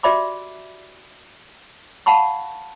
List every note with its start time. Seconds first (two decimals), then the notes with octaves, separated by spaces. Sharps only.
0.03 F#4 G4 D5 E5 B5 D6
2.06 F5 F#5 A5 B5 C#6